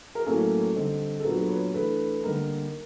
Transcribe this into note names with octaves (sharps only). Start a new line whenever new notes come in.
A#4
A2 F#3 A#3 C#4 A4
D3 G3 C4 D#4
A4
A#2 F#3 B3 D4 A#4
A4 B4
B4 C#5
E3 A3 D4 A4 B4
D3 G3 A#3 D#4 A#4